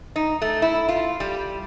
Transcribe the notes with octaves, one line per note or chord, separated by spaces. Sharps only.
D#4
A3
E4
F4
G3